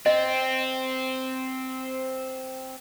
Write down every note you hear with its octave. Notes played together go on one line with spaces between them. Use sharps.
C4 D#5